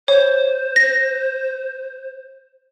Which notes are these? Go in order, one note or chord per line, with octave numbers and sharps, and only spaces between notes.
C5 C#5
A#6